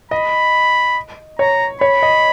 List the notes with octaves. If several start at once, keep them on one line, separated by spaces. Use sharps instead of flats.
D#5 B5
C#5 A#5
C#5 B5
D#5